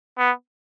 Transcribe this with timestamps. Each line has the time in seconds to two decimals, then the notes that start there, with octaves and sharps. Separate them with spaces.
0.18 B3